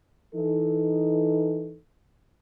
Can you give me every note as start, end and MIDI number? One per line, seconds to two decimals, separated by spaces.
0.35 1.77 52
0.35 1.77 63
0.35 1.77 69